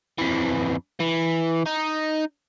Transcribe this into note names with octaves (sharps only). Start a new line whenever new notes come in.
F2 E3
E3
D#4